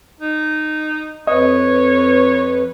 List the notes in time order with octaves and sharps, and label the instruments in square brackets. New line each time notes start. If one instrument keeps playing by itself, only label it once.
[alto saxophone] D#4
[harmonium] F2 B4 [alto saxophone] C#5 [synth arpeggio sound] D#5